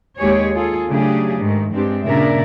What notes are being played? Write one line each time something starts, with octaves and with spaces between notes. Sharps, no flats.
D#2 G#3 G4 G#4 C#5
F4 G#4 A4
C#3 F#3 A3 D4 G4 G#4
G#2 D#3 A3
G2 G#3 C4 D4 G4
A#2 C#3 D4 A#4 D5 E5